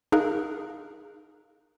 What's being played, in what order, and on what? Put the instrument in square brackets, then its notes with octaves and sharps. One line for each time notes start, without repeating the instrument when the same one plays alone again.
[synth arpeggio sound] D#4 G#4 A#4 F5 A#5 F#6